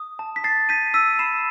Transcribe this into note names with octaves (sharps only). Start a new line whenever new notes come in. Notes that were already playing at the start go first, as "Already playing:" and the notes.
Already playing: D#6
A5
B6
A5 A6 C7
G6 B6 D#7
E6 B6 D#7
B5 C7 E7